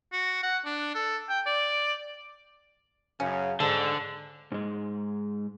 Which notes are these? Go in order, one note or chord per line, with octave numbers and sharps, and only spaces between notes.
F#4
F#5
D4
A4
G5
D5
F#2 C#3 C#4 F5
G#2 D3 A4
G#2 G#3